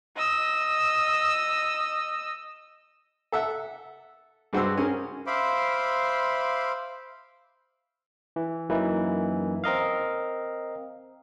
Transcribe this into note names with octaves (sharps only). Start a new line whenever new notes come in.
D#5 E6
A4 E5 F#5
G2 G#3 F#4 C5 C6 E6
C#4 G#4 A#4
C5 E5 F5 B5 C6 D6
E3
F#2 E3 A#3 D#4 E4
C4 A#4 D#5 F5